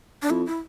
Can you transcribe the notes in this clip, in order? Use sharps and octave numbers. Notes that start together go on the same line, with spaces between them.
D4
F2 E4
E4